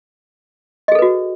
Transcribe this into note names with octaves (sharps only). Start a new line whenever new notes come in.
F#4 G#4 A4 B4 D#5